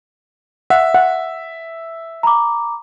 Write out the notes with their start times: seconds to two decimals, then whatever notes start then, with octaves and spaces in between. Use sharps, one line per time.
0.70 E5 F#5
0.94 F#5
2.23 A#5 B5 D6